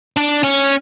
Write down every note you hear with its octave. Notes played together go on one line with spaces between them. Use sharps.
D4
C#4